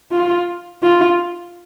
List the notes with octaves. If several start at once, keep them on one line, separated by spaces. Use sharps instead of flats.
F4
F4